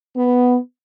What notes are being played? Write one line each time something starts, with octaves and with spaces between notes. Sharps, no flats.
B3